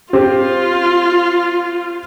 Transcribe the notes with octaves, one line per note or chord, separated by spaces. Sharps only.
C4 F4 G4